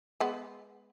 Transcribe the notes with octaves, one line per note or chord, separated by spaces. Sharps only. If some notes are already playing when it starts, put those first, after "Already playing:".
G#3 B3